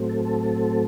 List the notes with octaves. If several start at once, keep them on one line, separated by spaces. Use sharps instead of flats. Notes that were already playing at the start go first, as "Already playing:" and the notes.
Already playing: A2 F#3 A3 C4
A4
A4